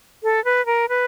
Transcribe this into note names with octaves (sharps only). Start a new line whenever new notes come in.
A4
B4
A#4
B4